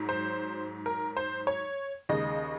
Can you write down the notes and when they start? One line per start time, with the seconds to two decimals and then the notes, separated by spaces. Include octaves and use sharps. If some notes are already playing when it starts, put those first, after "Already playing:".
Already playing: G#2 F#3
0.09 C5
0.86 A#4
1.17 C5
1.47 C#5
2.09 D#2 C#3 G#3 D#5